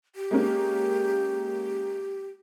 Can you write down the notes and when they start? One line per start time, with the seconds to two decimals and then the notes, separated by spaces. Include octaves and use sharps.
0.16 G4
0.31 G#3 A#3 C#4